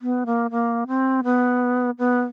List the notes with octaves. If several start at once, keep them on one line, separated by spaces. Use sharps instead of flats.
B3
A#3
A#3
C4
B3
B3